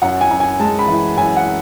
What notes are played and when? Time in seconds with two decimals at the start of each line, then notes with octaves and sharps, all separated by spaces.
0.02 F#2 F#5
0.21 G#5
0.31 F#2
0.40 G#5
0.59 G#3 A5
0.79 B5
0.88 E3
1.17 F#2 G#5
1.36 F#5